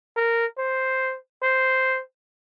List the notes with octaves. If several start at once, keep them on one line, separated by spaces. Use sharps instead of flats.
A#4
C5
C5